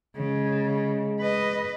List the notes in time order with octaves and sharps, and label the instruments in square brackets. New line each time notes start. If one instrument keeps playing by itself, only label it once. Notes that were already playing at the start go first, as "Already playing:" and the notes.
[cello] C#3 [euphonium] G#3
[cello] B4 D#5